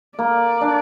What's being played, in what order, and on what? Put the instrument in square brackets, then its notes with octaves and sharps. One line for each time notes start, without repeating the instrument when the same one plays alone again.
[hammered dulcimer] A#3 [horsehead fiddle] D5
[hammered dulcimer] D4